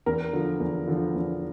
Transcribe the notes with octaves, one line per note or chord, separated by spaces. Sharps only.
E2 A#4
D3 F3
E2
D3 F3
E2